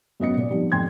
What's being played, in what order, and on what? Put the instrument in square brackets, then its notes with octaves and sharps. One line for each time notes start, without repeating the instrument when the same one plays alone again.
[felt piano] F#2 B3 D#5 C#7
A#2 D5
F3 G3 B3 C4 D#4
F2 G3 G5 C6 G#6